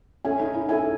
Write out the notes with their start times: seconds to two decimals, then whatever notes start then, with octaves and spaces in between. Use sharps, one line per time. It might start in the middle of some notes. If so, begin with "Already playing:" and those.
0.25 C#4 A4 E5 G#5
0.40 D#4
0.54 E4
0.68 E4 A4 E5 G#5